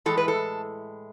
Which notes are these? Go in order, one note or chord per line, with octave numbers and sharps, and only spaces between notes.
A2 E3 G#3 A4
B4
A4